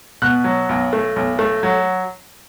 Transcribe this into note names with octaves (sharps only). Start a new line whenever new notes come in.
B2 F#6
F#3
B1
A3
B1
A3
F#3